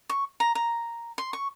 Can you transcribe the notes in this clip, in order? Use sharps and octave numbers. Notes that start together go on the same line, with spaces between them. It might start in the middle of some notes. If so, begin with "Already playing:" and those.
C#6
A#5
A#5
C6
C#6